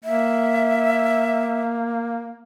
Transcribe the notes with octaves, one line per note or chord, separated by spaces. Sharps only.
A#3 E5